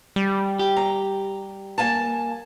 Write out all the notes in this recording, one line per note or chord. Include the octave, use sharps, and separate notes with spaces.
G3
G4
A#5
A#3 G#5 A5